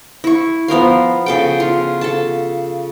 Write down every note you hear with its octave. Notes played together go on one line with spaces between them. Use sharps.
E4 C#6
F3 B3 A#4 F5
C#3 A4 G5
F4
A4 A5